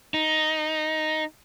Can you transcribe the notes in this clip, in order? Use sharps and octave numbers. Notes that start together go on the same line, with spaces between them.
D#4